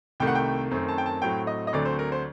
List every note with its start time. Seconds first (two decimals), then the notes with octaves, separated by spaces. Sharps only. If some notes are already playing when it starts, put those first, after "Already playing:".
0.20 C2 C3 D#3 A3 G5
0.27 F#5
0.35 G5
0.71 F#2 D#3 A3 C4
0.88 A5
0.98 G5
1.06 A5
1.22 A2 F#3 A3 C4 G5
1.47 D#5
1.67 D#5
1.73 D2 D3 F#3 A3 C4 D5
1.85 C5
1.99 A#4
2.12 C5